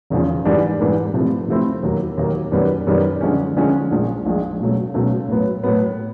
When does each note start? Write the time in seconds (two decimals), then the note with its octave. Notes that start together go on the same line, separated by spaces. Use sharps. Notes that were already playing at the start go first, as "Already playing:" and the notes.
0.10 E1 E2 C#3 F3
0.45 G#2 E3 G3 B3 D4
0.80 G#2 E3 G3 B3 D4
1.14 C3 F3 A3 C4 E4
1.48 C3 F3 A3 C4 E4
1.83 D#2 D#3 F#3 A#3
2.18 D#2 D#3 F#3 A#3
2.52 F#2 D#3 G3 B3
2.87 F#2 D#3 G3 B3
3.21 D3 F3 G#3 C#4
3.57 D3 F3 G#3 C#4
3.91 A#1 A#2 F3 G#3
4.26 A#1 A#2 F3 G#3
4.60 C#2 B2 F#3 A3
4.94 C#2 B2 F#3 A3
5.28 A2 F#3 B3
5.64 A2 F#3 B3